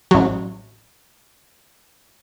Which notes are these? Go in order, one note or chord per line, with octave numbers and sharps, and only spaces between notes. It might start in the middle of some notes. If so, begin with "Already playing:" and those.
A1 F#3